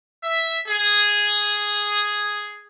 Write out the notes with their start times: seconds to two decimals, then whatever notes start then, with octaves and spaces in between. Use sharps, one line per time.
0.23 E5
0.67 G#4